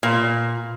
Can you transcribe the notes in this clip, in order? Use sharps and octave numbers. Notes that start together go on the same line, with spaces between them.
A#2